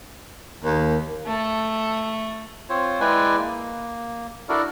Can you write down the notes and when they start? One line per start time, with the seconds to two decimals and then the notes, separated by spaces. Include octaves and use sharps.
0.64 D#2 A#3
1.27 A3
2.69 C4 F4 C5 C#5
3.00 G#3 E4 B4 D5 G5 G#5
3.38 A#3
4.49 D4 E4 F#4 A4 A#4 D5